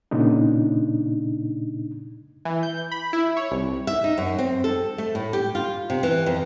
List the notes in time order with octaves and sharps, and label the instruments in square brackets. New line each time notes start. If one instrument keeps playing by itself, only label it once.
[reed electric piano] A#2 C#3 D4 D#4
[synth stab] E3
G6
B5
E4
C#5
C2
[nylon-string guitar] E5
D#4
F#2
C4
A4
A3
A2
G4
F4
C3
E3
F2